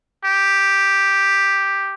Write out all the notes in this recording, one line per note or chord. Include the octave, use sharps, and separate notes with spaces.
G4